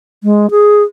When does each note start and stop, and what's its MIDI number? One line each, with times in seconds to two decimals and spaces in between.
0.24 0.50 56
0.51 0.83 68